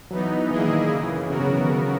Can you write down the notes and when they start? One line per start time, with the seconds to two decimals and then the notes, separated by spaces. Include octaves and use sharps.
0.11 E3 F#3 B3 D#4
0.51 A#2 E3 A#3 E4 G#4 D#5
0.61 D#3
0.90 F#2 C#3 E3
1.30 C#3 F#3 B3 F#4 A#4
1.40 C#3
1.50 E3
1.60 D#3
1.70 C#3